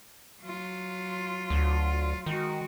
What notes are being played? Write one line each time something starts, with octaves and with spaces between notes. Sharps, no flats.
F#3 F4
D2
D#3 G#3 F#4